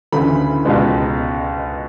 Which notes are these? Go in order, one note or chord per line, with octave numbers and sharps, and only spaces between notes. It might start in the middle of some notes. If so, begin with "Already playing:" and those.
D2 C#3 E3 B5
C#2 B2 G#3 B3